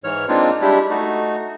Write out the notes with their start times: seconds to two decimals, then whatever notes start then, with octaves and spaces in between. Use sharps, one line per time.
0.04 G#2 E3 C#5 F6
0.28 G#3 A#3 C4 D4 D#4 F4
0.61 G3 G#3 D4 E4 G4
0.90 A3 D#4 F#4